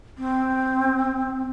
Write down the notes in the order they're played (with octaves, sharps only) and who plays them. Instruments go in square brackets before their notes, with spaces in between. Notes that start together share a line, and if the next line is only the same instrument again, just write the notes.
[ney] C4